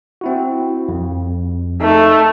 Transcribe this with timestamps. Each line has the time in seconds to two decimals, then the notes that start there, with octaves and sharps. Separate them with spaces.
0.21 C4 E4 F#4
0.88 F2
1.81 A3 D#4